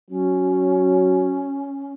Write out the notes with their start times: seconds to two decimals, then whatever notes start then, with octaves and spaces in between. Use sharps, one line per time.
0.10 F#3 C#4